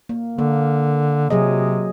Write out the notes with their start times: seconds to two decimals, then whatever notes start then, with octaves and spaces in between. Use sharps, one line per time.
0.09 A#3
0.38 D3 A#3
1.30 C3 F#3 G#4 D#5